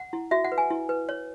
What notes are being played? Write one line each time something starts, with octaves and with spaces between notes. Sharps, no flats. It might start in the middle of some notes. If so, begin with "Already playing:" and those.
Already playing: F#5
E4
F#4 E5
F#5
B4
G#5
E4
B4
C#5